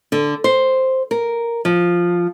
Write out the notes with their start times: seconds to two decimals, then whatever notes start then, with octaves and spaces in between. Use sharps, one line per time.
0.12 D3
0.44 C5
1.11 A#4
1.65 F3